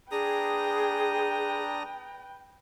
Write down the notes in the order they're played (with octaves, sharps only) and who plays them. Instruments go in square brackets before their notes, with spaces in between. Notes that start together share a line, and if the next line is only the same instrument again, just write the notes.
[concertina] D4 A#5 D#6 [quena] G#4 [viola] B4 G5